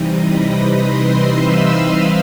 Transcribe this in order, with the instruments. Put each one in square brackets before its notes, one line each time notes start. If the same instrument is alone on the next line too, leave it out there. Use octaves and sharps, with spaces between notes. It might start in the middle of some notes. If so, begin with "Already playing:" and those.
Already playing: [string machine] C3 E3 G3 C4 D#4 D#5 D#6
B4 B5
C5 C6
E5 E6
F5 F6